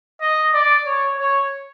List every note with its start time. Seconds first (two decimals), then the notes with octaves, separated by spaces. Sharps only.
0.21 D#5
0.54 D5
0.86 C#5
1.18 C#5